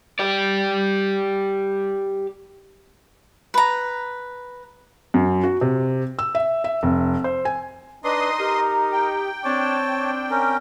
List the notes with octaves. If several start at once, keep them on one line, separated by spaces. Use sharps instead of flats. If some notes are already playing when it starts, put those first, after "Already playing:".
G4 D5
B4 A#5
F#2
F#4
C3
E6
E5
E5
F1
C5
G#5
D4 D#4 B4 D#5 C6 D#6
G4 A#4
G5
C4 D4 C#5 A5
D4
C#4 A#4